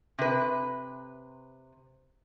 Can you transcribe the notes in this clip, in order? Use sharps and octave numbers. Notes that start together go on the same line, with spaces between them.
C3 B4